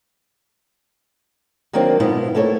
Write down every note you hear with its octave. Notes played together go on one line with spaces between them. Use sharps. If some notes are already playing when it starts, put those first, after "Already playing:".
D#3 F#3 A#3 C4 D4
G#2 B2 B3 E4 F4
A3 A#3 E4 A4 C#5